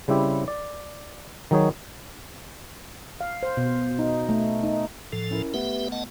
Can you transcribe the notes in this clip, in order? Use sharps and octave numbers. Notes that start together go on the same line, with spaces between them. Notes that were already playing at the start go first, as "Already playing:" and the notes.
C#3 G3 C4 E4 G4
D5
D#3 F#3 D#4 G#4 C#5
F5
C5
B2
D#4
A3
D#4
A2 F3 A4
C#4 E4 A#4
A3 B3 G4 B4 E5
D#5 F#5 A5